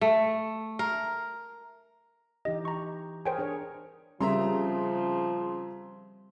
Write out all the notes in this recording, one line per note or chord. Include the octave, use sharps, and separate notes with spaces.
A3
A#4
E3 D#4 G4 D#5
A#5 C#6
G#4 A#4 C5 C#5 G5 G#5
D4 G#4 C#5
C#3 F3 G3 C4 A#4 E5 A#5 C6